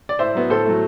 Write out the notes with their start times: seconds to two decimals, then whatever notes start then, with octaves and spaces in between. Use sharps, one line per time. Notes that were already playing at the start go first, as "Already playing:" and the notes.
0.09 D5
0.19 A2 C5 E5
0.35 F#3 B3
0.50 A2 A4 C5
0.65 F#3 A3